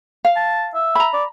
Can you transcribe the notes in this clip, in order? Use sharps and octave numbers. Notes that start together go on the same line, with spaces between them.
F5
A5
E5
A#5 B5
D5